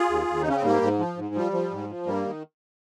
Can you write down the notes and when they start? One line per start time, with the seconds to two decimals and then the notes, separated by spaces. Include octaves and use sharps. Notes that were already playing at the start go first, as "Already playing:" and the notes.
Already playing: F4 G#4
0.09 D#2
0.28 D#2
0.42 D#4
0.45 C#3 C#4
0.56 C4
0.63 G#2 G3 A#3
0.81 G#2
0.99 F3
1.17 G#2
1.35 F3 G3
1.52 F3
1.71 G#2
1.89 F3
2.06 G2 G3 A#3
2.25 D#3